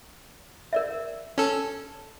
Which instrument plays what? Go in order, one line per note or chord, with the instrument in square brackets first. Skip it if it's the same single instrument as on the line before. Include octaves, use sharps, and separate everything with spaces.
[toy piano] A#4 D5 E5
[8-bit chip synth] C#4 A4 [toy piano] C#6